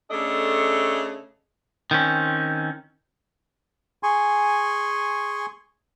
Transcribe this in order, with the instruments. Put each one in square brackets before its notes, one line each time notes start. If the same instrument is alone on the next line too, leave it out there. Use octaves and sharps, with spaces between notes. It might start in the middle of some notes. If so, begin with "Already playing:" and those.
[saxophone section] C#3 A3 D4 A4 D#5
[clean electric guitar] D#3 C4 C#4
[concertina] G#4 G#5 C6 C#6